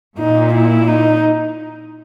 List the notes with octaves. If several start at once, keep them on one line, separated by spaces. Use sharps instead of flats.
A#2 D#4
E4
D#4